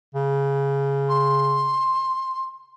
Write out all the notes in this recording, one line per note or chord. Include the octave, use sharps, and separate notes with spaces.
C#3
C6